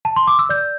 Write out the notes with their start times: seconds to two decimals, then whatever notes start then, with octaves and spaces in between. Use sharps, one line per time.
0.05 A5
0.16 C6
0.27 D6
0.39 E6
0.49 D5 G6